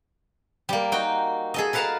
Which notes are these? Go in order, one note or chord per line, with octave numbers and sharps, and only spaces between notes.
G3 A#3
D#4 F#4 G5
G#4 A4 D#5
A#4 B4 F5 F#5 A5 A#5